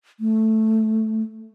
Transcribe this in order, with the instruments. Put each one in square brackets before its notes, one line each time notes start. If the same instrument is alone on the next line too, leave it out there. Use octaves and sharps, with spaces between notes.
[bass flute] A3